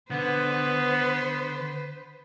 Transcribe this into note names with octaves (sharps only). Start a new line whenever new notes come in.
D3 B3 B4 C5